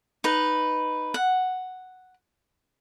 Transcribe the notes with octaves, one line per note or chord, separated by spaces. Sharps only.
D#4 B4
F#5